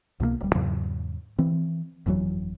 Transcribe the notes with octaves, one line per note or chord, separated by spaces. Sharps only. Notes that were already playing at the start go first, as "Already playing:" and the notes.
C2 B2 G#3 A#3
D1 G3
E2 G#2 C#3 F#3
E3 C4
G1 F2 E3 F#3